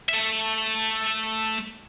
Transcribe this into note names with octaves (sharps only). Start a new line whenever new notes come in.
A3 E5